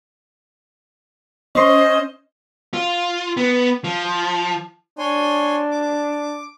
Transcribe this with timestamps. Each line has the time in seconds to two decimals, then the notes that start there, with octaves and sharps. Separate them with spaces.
1.55 C#4 C5 D#5
2.74 F4
3.37 B3
3.84 F3
4.98 D4 C#5 G#5 C6
5.71 D6